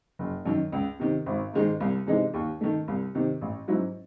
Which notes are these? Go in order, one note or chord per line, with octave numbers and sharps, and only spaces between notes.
F#1
F#2 D#3
C#2
C3 D#3
G#1
G#2 D#3 G#3 D#4
C2
C3 E3 G#3 D#4
D#2
D#3 A3
C2
C3 D#3
A1
G#2 F#3 C#4 E4